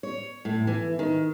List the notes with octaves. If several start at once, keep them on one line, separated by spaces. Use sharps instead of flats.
C#5
A2
E3
D#3